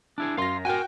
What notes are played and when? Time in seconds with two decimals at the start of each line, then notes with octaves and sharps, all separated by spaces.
0.18 D4 E4 G#4
0.37 F#2 F5 C6 A#6
0.65 F#4 A#4 G5 G#5